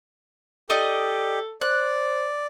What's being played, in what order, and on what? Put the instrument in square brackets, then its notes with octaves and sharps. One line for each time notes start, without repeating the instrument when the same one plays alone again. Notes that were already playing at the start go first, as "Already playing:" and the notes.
[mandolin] D#4 D5 D#5 [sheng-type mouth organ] G4 [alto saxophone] A4
[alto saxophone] C5 [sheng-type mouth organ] D5 [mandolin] F#6